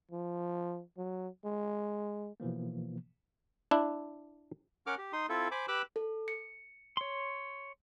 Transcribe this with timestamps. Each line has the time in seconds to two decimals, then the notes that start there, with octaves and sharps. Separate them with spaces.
0.12 F3
0.97 F#3
1.45 G#3
2.40 B2 E3 F3 A#3
3.71 D4 E4
4.87 C#4 A#4 F#5 D6 F6
4.98 G4
5.13 D#4 C6 D#6
5.29 C4 E4 F4 A4
5.51 C5 G#5 B5 D6
5.68 G4 B4 D6 E6 F#6
5.96 A4
6.28 C#7
6.97 C#5 C6